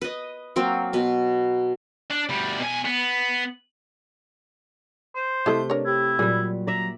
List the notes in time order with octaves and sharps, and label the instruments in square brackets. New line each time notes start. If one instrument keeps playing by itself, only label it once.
[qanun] B4 D#5
F#3 A#3 C4
B2 B4
[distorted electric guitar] D4
D2 G3
B2 G#5
B3
[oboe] C5
[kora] C3 A3 [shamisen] E4 A4 D#5 [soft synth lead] G6
[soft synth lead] D4 [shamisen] A#4 C#5
[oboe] E4 [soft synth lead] G4
[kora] A#2 G3 [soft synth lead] F#3 [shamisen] G#4
[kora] D5 E5 [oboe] A#5